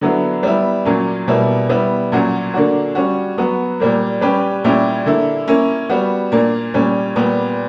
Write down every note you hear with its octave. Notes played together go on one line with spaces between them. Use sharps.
D3 F#3 B3 E4
G3 B3 E4
A#2 F#3 A#3 C#4
B2 G3 A#3 E4
G3 B3 E4
A#2 F#3 C#4 F#4
D3 A#3 D4 F#4
G3 C#4 F#4
F#3 B3 F#4
A#2 G3 A#3
G3 C#4 G4 B4
A#2 G3 C#4 E4 G4
D3 A#3 E4
A#3 C#4 E4
G3 B3 F#4
A#2 A#3 D4
A#2 G3 C#4
A#2 G3 B3